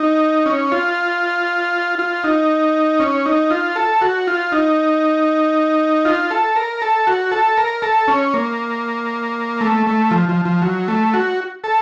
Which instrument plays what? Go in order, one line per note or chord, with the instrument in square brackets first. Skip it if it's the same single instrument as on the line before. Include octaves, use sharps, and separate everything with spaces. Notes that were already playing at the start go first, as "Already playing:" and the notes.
Already playing: [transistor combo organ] D#4
C#4
F4
F4
D#4
C#4
D#4
F4
A4
F#4
F4
D#4
F4
A4
A#4
A4
F#4
A4
A#4
A4
C#4
A#3
A3
A3
F3
F3
F3
F#3
A3
F#4
A4